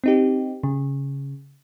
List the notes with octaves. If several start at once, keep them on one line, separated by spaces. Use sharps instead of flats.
C4 D#4 G4
C#3